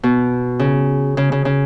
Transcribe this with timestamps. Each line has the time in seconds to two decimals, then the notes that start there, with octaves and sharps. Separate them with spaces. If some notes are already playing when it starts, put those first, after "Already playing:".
0.03 B2
0.59 C#3
1.17 C#3
1.32 C#3
1.45 C#3